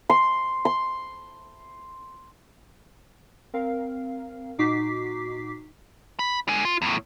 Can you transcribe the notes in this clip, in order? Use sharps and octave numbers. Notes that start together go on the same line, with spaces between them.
C6
C6
C4 A#4 F5
A#2 D#4 F#4 D6 B6 C7
B5
D3 G#3
F4
E2 A2